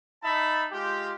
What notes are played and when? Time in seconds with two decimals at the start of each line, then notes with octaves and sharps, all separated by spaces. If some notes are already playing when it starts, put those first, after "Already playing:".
0.24 D#4 E5 A5 B5
0.72 G#3 F4 G4